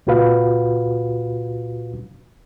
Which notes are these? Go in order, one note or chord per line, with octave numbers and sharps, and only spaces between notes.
C#2 A#2 F4 F#4 B4 F5